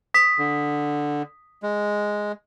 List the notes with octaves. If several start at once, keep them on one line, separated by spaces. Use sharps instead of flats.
D#6 B6
D3
G#3